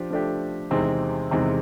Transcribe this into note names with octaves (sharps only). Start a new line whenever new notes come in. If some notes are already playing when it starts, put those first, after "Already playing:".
Already playing: F3 D4 G4
F3 A3 D4 G4
E2 C3 D#3 G#3 C4
E2 C3 D#3 G#3 C4